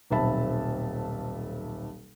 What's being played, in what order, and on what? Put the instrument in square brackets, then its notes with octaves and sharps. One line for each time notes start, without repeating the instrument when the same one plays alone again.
[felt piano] D#1 B1 C4 E5 A5 B5